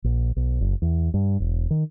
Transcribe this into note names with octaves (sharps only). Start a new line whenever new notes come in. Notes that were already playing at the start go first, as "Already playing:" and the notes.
A#1
B1
F#1
E2
G2
E1
D#3